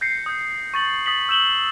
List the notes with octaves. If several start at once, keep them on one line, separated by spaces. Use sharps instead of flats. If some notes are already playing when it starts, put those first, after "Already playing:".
G6 A#6 C7 C#7
D#6 G6
C#6 A6 F#7
D#6 A6 B6 F#7
E6 G6 E7 F#7 G7